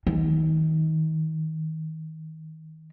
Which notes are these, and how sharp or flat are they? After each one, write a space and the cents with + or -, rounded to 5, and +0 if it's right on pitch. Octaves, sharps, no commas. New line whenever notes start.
D#3 +30